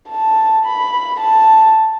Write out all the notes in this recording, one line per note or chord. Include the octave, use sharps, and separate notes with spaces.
A5
B5
A5